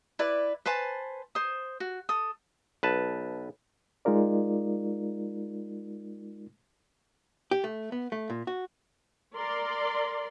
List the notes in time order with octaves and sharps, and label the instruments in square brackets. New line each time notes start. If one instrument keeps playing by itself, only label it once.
[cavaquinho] E4 B4 D5 D6
B4 C5 G#5 A5
C5 D#6
F#4
A4 D#6
[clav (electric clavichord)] B1 B4 A5
[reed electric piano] G#3 D#4 F4 A#4 D5
[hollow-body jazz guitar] G4
A3
B3
A3
A#2
F#4
[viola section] A#4 D5 C6